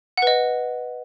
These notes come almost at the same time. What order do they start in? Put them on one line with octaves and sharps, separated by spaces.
F#5 B4 D#5